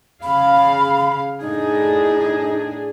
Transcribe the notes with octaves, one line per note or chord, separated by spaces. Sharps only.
C#3 F5 B5
A2 D4 D#4 G#4